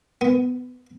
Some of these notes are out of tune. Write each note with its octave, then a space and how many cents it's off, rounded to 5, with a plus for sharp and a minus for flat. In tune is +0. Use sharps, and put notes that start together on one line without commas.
B3 +20